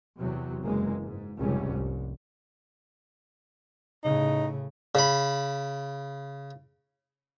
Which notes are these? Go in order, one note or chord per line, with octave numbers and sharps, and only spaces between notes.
E2 C3 F#3
F#1 E3 G#3 A#3
G#2
F1 C#2 G#2 G3 C#4
C2
A2 C#3 D#4
C#3 B5